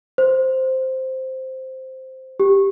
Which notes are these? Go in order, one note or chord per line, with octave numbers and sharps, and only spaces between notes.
C5
G4